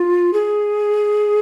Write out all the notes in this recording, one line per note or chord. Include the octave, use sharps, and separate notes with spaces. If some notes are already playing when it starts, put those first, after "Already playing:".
Already playing: F4
G#4